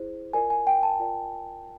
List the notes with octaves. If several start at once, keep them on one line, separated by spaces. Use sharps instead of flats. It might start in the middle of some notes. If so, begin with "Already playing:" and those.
Already playing: E4 G#4 C5
F4 A#4 D5 G#5
G#5
G5
A5
F4 A#4 D5